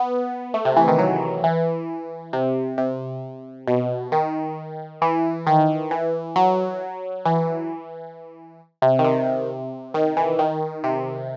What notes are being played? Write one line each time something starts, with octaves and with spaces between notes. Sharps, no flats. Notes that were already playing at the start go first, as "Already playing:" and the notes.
Already playing: B3
A3
C3
E3
D#3
F#3
E3
C3
C3
B2
D#3
E3
D#3
E3
F#3
E3
C3
D#3
C3
D#3
E3
D#3
C3